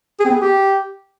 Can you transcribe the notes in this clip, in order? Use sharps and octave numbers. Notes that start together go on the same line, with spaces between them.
G#4
C4
B3
G#4
G4